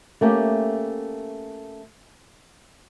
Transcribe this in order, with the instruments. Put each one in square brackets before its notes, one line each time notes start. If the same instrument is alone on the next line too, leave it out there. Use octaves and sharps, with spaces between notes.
[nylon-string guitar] A3 A#3 C#4 G4